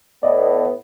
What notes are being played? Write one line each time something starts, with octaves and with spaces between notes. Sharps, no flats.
A2 B3 D5 D#5